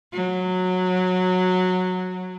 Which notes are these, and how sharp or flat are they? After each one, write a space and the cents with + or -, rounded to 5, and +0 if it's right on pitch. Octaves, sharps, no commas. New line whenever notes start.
F#3 -15